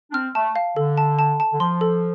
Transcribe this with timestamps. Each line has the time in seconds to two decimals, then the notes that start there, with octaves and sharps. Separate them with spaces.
0.10 D4
0.14 C4 F6
0.35 A3 A5
0.56 F5
0.76 D3 A4
0.98 A5
1.19 A5
1.40 A5
1.53 D3
1.60 F3 C6
1.81 A4